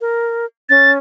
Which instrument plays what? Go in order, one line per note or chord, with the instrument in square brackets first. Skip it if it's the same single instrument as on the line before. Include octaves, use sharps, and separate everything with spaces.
[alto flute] A#4
[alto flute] C#4 [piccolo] A6